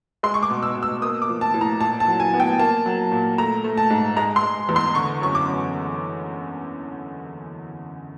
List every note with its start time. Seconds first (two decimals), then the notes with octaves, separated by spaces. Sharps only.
0.23 G#3 C6
0.34 C#6
0.43 D6
0.50 B2
0.63 E6
0.76 B2
0.83 E6
1.02 A#3 D#6
1.22 D6
1.28 F3
1.41 A5
1.54 A2
1.61 A#5
1.80 A#2 A5
2.00 A5
2.07 F#3
2.20 G#5
2.34 B3
2.40 G5
2.59 A#3 A5
2.86 F#3
3.12 A#2
3.38 A3 A#5
3.64 A3
3.78 A5
3.90 G#2
4.17 G#3 A#5
4.36 C6
4.43 G#3
4.69 E2
4.76 C6
4.95 D3 C#6
5.22 F#2 C#6
5.35 D6
5.48 F#2